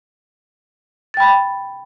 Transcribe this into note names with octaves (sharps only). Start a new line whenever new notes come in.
G5 B5 A6